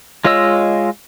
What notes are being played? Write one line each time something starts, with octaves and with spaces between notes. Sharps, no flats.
G#3 F4 C#5 D#5 E6